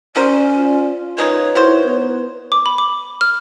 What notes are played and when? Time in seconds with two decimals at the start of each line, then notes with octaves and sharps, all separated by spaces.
0.16 C#4 F#4 A#4 C5 D5
0.57 F4
1.18 D#3 G#3 D#4 B4 C#5
1.55 D#3 E4 F#4 C5
1.86 B3
2.52 D6
2.66 B5
2.78 D6
3.21 F6